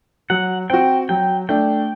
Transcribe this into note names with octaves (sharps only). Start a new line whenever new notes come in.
F#3 F#5
C4 F#4 G5
F#3 G5
A3 D4 G5